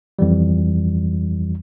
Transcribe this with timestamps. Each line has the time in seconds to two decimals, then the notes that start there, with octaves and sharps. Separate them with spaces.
0.19 F2 E3 G3